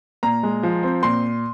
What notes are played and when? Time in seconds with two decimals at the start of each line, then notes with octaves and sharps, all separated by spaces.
0.23 A#2 A#5
0.43 G#3
0.63 F3
0.83 C4
1.03 A#2 C6